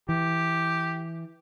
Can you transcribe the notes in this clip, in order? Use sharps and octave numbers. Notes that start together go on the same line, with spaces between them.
E3 G4